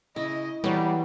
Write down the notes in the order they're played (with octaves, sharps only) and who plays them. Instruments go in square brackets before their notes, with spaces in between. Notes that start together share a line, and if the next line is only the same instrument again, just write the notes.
[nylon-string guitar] C#3 [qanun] E4 [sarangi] D#5
[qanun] E3 [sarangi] F#3 [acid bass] G3 [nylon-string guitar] B3 C#5